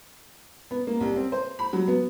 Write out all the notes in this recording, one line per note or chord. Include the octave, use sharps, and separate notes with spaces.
B3
A#3
C2
C4
C5
B5
F#3
B3